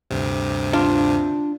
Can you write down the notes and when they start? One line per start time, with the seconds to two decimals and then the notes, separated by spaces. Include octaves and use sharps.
0.11 D2 G2 C3
0.73 D4 F4